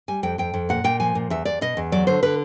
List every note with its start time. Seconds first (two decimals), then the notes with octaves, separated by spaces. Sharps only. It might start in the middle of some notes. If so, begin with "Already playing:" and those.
0.08 G3 G#5
0.23 F2 G5
0.38 F2 G5
0.54 F2
0.69 A#2 F#5
0.84 A#2 G5
1.00 F3 G#5
1.15 A#2
1.30 E2 E5
1.45 E2 D5
1.61 B2 D#5
1.77 E2
1.92 F#3 D5
2.07 D3 C5
2.23 D3 B4